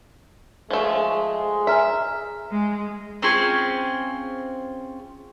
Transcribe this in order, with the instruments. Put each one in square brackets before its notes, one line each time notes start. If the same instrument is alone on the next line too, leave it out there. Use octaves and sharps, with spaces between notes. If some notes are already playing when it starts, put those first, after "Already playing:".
[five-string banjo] F3 A3 [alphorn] G#3
[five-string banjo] E5 [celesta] G#5 A#5 F6
[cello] G#3
[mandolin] C4 C#4 F4 G#4